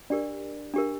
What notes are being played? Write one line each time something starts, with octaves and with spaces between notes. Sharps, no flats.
D4 G4 A#4 D5
D4 G4 A#4